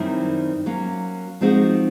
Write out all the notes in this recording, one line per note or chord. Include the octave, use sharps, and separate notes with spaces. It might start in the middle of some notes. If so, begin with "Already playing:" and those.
Already playing: F#2 D#3 G3 C4 E4
F#3 A#3 C#4
F3 G#3 C4 D#4 F#4